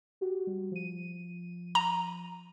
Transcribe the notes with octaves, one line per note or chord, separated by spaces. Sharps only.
F#4 G4
G3
F3 D#7
A#5